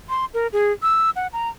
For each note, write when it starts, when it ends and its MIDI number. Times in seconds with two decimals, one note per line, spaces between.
0.09 0.25 84
0.34 0.47 70
0.53 0.72 68
0.83 1.10 88
1.16 1.27 78
1.33 1.49 82